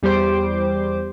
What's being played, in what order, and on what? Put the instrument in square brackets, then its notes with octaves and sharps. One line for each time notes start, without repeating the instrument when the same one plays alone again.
[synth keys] E2 G3 G4 C5 D6